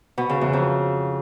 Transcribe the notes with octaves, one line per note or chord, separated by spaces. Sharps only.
B2
C#3
E2
F2